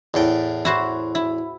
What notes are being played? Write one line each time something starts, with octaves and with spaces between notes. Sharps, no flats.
E2 A2 G5
E4 F#4 C5
E4